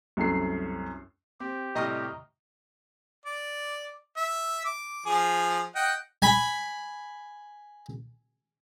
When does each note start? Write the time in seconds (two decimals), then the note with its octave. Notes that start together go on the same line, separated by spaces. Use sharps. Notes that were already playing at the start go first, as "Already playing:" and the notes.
0.17 C2 F#2 A3 C7
1.40 C4 G4
1.75 A2 C3 G3 D#5 A#5 C#6 F6
3.25 D5
4.17 E5
4.65 D6
5.06 F3 G#4
5.76 D#5 F#5 G5
6.22 G#5 B5